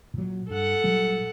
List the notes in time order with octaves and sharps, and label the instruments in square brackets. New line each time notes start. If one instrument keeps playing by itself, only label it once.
[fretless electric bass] A#2 F#3
[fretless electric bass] G2 [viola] A4 F#5
[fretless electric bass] A#2 F#3 G3